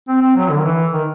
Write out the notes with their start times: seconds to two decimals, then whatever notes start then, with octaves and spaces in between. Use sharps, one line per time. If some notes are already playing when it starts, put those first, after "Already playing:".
0.08 C4
0.22 C4
0.36 F#3
0.50 D3
0.58 D#3
0.64 E3
0.93 D#3